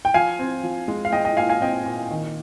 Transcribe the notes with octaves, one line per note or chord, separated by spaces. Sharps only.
G5
F3 F5 G#5
C4
F3
G#3
F5
G#3 D#5 G5
D#5 G5
A#2 F5 G#5
F5 G#5
C4 D#5 G5
A#2
D#3